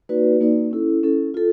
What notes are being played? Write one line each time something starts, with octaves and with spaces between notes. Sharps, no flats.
A#3 D#4 F#4 B4 D5
A#3 D#4 F#4 B4 D5
C#4 E4 A4
C#4 E4 A4
F4 A4